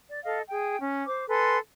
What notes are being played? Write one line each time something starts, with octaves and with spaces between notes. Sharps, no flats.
D5
A4 D#5 F5
G#4 G5
C#4
C5 D6
A4 B4 G#5 C6